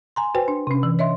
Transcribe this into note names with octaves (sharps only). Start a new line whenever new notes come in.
G#5 A#5 C6
F#4 B4 C5 G5 G#5
D4
C3 C#4
E3
C#5 D#5 E5 C6